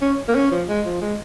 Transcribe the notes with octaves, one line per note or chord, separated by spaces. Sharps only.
C#4
A#3
C#4
F3
G#3
F3
G#3